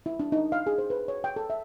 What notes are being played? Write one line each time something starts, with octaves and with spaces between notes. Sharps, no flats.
E4
D4
D#4
F5
G#4
C5
B4
C#5
G5
A4
E5